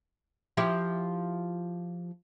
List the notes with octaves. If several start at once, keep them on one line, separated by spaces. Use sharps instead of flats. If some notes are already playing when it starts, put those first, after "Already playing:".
F3 E4 G4